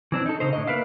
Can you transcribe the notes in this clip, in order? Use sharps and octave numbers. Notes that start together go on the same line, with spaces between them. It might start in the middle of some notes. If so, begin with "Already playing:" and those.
E3 C4 D4
D#4 A4
C#3 D#4 C5
A2 D3 D#5
A#3 B3 A#4 B4 E5 F5